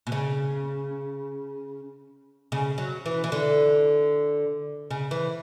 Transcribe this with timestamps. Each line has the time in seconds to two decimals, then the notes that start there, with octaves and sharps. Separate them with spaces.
0.07 B2
0.12 C#3
2.52 C#3
2.78 F#3
3.06 E3
3.24 E3
3.32 D3
4.91 C#3
5.11 E3